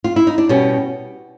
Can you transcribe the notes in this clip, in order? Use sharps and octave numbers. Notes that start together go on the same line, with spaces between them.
F4
E4
D#4
D4
B2 G3 C#4